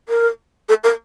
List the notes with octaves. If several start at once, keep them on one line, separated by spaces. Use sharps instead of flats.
A#4
A4
A#4